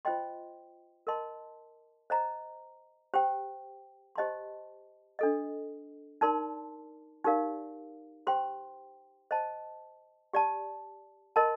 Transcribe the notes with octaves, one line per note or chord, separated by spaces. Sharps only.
F4 C5 D#5 G5 C6
A#4 D#5 A5 C6
C5 D#5 A#5
G4 C5 G5
G4 C5 D#5 A5 C6
D4 A4 D#5
D#4 A#4 D5 A5 C6
D#4 G4 A#4 D5 F5
G4 C5 G5 C6
C5 D#5 A5
G4 D5 A5
A#4 D#5 A5 C6